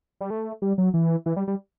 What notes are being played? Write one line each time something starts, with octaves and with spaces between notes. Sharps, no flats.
G3
A3
G3
F#3
E3
E3
G3
G3